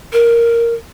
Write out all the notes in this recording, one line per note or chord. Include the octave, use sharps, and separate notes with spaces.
A#4